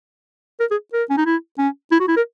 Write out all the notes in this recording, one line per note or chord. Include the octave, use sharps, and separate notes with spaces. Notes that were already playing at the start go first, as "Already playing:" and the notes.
A#4
G#4
A#4
C#4
D#4
E4
C#4
E4
F#4
E4
A#4